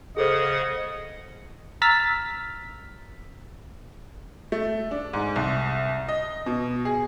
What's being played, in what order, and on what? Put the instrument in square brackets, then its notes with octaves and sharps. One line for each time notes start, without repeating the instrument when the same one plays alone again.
[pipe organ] C#3 F#5 [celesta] G#4 A4 C5 [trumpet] D#5
[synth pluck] A#5 E6 F6 A6 B6
[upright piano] A3
D4
G#2
C2
D#5
B2
G#4